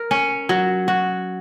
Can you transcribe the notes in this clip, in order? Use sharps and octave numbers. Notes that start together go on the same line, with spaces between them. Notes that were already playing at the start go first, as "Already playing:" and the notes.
Already playing: A#4
C#4
F#3
F#4